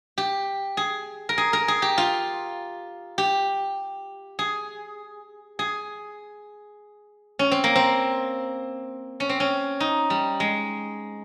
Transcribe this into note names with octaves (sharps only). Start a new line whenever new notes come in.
G4
G#4
A#4
G#4
A#4
G#4
G4
F4
G4
G#4
G#4
C#4
C4
A#3
C4
C#4
C4
C#4
D#4
G3
G#3